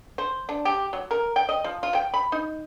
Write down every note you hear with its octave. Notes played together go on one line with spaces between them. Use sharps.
C5
D4
G4
F#3
A#4
G5
D#5
F3
F4
G5
B5
D#4